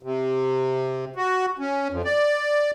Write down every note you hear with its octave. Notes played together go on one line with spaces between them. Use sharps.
C3
F#4
C#4
F2
D5